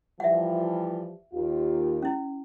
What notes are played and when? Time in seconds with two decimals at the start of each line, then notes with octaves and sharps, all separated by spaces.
0.20 E3 F3 G3 E5 F#5
1.33 D#2 F4 G4
2.02 C#4 E4